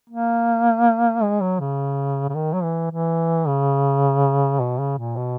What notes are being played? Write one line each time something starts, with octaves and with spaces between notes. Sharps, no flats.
A#3
G#3
F#3
C#3
C#3
D#3
F#3
E3
E3
C#3
B2
C#3
A#2
B2